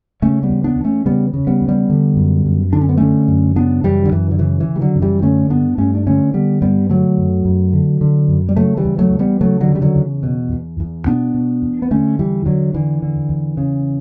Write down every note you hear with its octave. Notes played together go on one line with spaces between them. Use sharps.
C#3 A3 C#4
G3 B3
E2
B3 D4
E2
A3 C#4
C#3 G3 B3
C#3
G3 B3
E2
G3 B3
D3
F#2
F#2
D3 D4
C#4
B3
D3 A3 C#4
F#2
C#3 B3 D4
F#2 E3 G3
D3
F#2 E3
D3
C#3 E3
E3
C#3
G3
D3 F#3
F#2
E3 G3
D3 A3 C#4
G2 B3 D4
G2 A3 C#4
D4
D3 A3 C#4
D3 G3 B3
G2 G3 B3
D3 F#3 A3
F#2
F#2
D3
D3
F#2
G3
C#3 F#3 A3
E3 G3
E2
F#3 A3
E2
G3 B3
C#3 F#3 A3
D3 F#3
C#3
G3
D3 F#3
E2
B2
E2
E2
B2 B3 D4
B2
E2
B3
D3 A3 C#4
E2 E3 G3
E2 D3 F#3
D3 E3
D3
E2
C#3